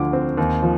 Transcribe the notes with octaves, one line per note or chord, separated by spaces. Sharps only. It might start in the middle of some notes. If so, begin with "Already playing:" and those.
Already playing: D2 D3 F3 D6
C4
D#2
F3